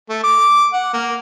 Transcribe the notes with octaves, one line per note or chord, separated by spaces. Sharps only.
A3
D6
F#5
A#3